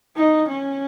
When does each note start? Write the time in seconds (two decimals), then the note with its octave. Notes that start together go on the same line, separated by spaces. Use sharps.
0.16 D#4
0.48 C#4